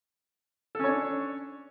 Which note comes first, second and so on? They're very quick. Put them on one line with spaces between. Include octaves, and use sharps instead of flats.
A4 C#4 C#5 D4